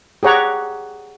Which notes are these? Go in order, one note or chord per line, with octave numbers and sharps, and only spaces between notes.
G4 G#4 C#5 F#5 A#5